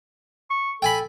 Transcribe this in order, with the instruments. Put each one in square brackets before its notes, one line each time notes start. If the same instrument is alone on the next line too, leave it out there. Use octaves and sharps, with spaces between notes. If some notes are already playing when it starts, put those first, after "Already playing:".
[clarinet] C#6
[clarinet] A4 [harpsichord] G5 G#5 B5